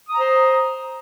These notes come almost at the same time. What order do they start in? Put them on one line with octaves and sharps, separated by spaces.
D#6 A#5 C5